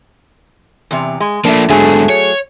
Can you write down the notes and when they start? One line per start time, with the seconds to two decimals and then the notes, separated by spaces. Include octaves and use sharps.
0.91 E2 C3
1.20 G#3
1.45 F3 A3 A#3 D4
1.70 G#2 D3 F#3 A3 G#4
2.09 C#5